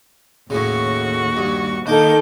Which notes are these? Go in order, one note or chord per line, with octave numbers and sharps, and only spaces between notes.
D#2 A2 C#3 F#4 C#6
G2
D#3 A#3 D#4 A4 D6 G6